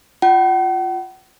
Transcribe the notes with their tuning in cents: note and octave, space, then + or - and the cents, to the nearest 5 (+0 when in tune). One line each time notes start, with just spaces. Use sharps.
F4 +0 F#5 +40